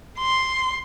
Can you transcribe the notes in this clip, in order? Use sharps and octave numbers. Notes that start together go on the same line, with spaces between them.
C6